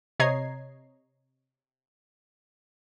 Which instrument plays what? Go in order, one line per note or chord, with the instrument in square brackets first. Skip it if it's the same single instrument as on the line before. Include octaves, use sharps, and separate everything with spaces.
[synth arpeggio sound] C3 C#5 D#5 A#5 G#6 C7